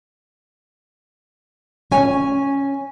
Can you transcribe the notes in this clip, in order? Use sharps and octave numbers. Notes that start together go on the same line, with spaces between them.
C#4 G#5